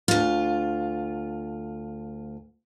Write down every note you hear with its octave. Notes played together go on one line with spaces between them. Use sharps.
D2 F4